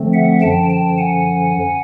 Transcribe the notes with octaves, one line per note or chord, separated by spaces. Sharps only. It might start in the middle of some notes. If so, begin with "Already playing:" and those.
Already playing: D3 F3 A3 C4
E5 F#5
F#2 D3 F3 G5 A5
G5 A5
F#5 G#5